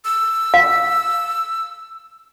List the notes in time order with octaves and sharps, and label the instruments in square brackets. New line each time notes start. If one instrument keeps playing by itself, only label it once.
[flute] E6
[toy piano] F5